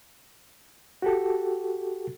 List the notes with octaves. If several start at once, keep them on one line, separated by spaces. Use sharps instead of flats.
F#4 G4 A4